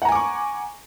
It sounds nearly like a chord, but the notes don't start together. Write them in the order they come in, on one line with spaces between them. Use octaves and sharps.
F#5 A#5 G#5 D6 C#6